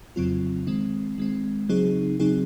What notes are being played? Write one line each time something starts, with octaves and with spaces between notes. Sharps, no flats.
F2 C#3 F#3 C4 F4
D#3 G#3 C4
D#3 G#3 C4
C#3 F#3 C4 D#4 G#4
C#3 F#3 C4 D#4 G#4